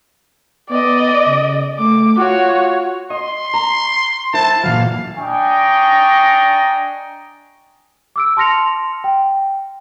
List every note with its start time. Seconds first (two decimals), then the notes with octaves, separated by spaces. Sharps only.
0.69 B3 D5 D#5
1.26 C#3
1.78 A3 D6
2.17 F4 F#4 C#5
3.10 D#5 C6
3.54 A#5
4.34 E4 C5 A5
4.64 A#2 E3 F#3 F5
5.18 D4 D#5 G5 G#5 A#5 C#6
8.16 D6 E6 D7
8.37 A5 C6 F6 A#6 C#7 F7
9.04 G5